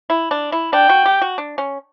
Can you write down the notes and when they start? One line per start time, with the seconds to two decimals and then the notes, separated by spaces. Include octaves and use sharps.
0.10 E4
0.31 D4
0.52 E4
0.73 D4 G5
0.89 F#4
1.06 G4
1.21 F#4
1.38 D4
1.58 C#4